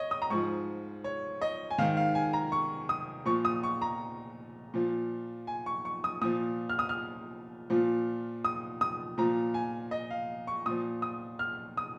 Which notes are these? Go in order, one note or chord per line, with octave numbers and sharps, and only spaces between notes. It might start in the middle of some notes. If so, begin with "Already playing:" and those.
Already playing: C#5 D#5
D#6
A#5
G#2 F3 C#6
C#5
D#5
G#5
G#2 D#3 F5
F5
G#5
A#5
C#6
D#6
A#2 F3 C#6
D#6
C#6
A#5
A#2 F3
G#5
C#6
C#6
D#6
A#2 F3 D#6
F6
D#6
F6
A#2 F3
D#6
D#6
A#2 F3 A#5
G#5
D#5
F5
C#6
A#2 F3 D#6
D#6
F6
D#6